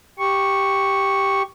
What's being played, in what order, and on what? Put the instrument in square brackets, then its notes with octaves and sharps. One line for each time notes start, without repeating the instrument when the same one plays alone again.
[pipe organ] G4 C#6